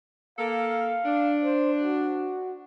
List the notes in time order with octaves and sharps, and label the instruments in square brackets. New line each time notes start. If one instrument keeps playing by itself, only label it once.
[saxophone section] A#3 A4 [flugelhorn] F5
[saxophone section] D4
[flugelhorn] C5
F#4